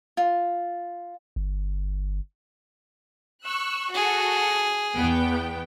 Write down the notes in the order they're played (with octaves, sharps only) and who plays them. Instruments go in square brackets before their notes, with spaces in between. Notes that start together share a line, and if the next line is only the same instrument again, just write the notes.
[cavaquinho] F4
[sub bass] G1
[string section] C#6 E6 F#6
[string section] F#4 A4 [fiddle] G#4
[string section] E2 B3 G5